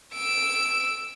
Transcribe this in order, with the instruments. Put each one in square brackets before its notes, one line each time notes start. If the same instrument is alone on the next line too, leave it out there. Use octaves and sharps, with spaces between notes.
[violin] E6 D7